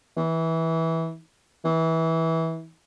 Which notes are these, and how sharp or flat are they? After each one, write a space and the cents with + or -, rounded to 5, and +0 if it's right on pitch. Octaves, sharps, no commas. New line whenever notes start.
E3 -15
E3 -20